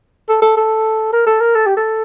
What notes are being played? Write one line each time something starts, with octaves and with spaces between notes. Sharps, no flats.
A4
A4
A4
A#4
A4
A#4
A4
G4
A4